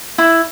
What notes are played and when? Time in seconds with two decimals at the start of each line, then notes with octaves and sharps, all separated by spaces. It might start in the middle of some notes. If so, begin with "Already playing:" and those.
0.18 E4